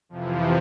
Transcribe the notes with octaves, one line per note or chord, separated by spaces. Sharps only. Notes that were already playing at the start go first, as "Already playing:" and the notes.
F2 C3 E3 F3